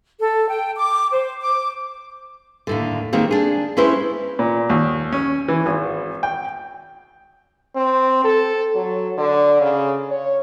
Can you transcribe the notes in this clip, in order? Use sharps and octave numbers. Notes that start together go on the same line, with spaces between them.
A4
G5
D6
C5
D6
D#2 A2 D3
D#3 G#3 A#3 C4
D4 G#4
G#3 C#4 E4 B4 C5
A#2
D#2
C#4
E3
G#1
G5
C4
A4
F#3
D3
C#3
C#5